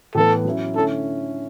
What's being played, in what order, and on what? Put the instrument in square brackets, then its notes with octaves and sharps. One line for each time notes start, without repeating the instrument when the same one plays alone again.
[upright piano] A2 E3 B3 [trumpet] A4
[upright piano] F#3 C#4 E4
[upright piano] D3 A3 C#4 E4 [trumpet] A4